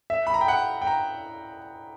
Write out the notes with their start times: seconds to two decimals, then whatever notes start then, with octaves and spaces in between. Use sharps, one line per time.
0.10 E5
0.27 B5
0.34 A#5
0.41 G5
0.48 F#5
0.82 G5
0.87 A#5